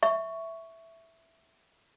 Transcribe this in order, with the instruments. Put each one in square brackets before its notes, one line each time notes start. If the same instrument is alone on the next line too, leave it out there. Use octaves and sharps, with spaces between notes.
[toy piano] E5 C#6